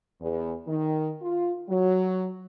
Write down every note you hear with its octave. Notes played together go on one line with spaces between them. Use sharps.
E2
D#3
F4
F#3